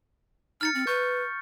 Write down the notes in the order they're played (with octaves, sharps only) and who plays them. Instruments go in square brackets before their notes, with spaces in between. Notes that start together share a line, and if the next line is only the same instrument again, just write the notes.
[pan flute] D#4 [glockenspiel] F6 A6 C#7
[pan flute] C4
[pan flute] B4 [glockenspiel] C#6 G6